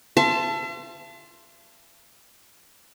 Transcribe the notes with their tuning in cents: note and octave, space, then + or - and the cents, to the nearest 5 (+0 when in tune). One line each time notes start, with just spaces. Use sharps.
E5 +45 A5 +0 C6 +5